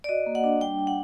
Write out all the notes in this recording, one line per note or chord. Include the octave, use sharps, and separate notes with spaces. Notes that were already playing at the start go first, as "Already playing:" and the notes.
D5
F#4 D#5
A#3
F#5
D4
G3 G5
D4
F#5